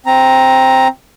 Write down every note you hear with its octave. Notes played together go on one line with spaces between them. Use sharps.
C4 A#5